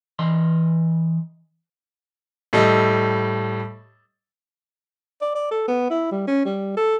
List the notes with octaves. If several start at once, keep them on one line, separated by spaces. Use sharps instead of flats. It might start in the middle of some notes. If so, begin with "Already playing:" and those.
E3 D#5 C6
A2 G3 A4 D#5
D5
D5
A4
B3
E4
G3
C#4
G3
A4